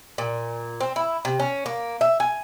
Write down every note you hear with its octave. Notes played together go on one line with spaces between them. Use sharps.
A#2
C4
E4
C3
C#4
A#3
E5
G#5